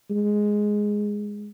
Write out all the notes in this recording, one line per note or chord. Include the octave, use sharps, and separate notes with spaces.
G#3